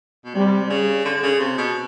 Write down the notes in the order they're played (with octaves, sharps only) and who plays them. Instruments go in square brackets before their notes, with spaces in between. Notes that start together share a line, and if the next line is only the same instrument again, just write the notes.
[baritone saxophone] B2
[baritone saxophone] C3 [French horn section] G3
[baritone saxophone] C#3
D3
D3
C#3
C3
B2